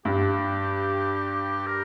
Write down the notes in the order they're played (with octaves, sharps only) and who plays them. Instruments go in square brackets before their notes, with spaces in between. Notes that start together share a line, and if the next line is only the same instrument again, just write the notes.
[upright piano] G2 [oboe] G4
[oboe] A#4